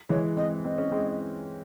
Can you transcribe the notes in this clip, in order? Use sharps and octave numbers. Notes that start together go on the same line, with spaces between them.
E3 G#3 C#5
G#3 C4 D#5
C4 D#5
C#4
G#3 C4